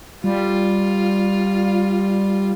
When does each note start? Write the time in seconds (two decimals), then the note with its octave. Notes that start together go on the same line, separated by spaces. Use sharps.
0.24 G3 F4